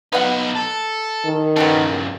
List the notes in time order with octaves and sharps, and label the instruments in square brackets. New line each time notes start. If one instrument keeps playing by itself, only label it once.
[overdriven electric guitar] B3 D#4 [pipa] B4 F5 F#5
[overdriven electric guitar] A4
[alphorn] D#3
[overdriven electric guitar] G2 C#3 [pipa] B3 G4 A4